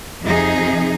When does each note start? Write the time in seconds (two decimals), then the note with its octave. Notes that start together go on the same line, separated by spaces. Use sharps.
0.22 F2 C3 D#4 G#4